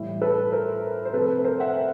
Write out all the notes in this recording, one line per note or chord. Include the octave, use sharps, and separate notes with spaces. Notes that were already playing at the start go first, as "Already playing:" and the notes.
Already playing: A2 E3 G3
A4 B4
A#4 C5
C5
C3 F3 A3 C4 A4 B4
A#4 C5
E5 F#5